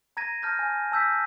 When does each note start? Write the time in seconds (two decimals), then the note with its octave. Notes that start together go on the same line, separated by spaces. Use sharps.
0.17 A#5 G#6 A#6 D#7
0.42 A5 F6 G6 A#6
0.59 G#5
0.92 A5 E6 G6 B6